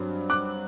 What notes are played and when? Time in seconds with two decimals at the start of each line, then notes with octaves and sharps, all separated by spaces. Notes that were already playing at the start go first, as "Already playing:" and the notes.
Already playing: G2 F#3 C4
0.30 D6 F#6